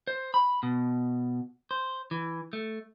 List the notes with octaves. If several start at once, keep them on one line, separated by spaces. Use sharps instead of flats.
C5
B5
B2
C5
E3
A3